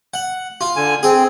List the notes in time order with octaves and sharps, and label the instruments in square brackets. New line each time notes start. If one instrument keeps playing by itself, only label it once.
[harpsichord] F#5
F4
[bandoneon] D3 G#5
[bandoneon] C4 [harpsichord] G#4